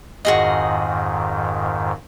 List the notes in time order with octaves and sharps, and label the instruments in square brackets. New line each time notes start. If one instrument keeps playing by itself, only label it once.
[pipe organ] F2 G#2 D#3 [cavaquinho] F#4 G#4 D#5